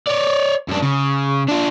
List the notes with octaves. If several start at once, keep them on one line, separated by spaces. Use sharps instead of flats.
C#5 D5
F#2 D4
C#3
D4 F4